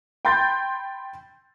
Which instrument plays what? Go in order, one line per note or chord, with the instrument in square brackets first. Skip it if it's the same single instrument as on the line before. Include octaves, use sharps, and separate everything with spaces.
[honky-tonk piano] G5 B5 C6 G6 A6